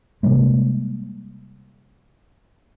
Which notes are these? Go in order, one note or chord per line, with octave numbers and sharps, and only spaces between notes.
C3 G3 G#3 A#3